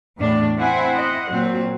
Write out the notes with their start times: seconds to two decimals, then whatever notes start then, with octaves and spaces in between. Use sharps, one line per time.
0.19 E2 A2 D4
0.58 C4 E4 C5 F#5 G#5
0.93 D#5 F#5
1.31 A#2 F#3 C4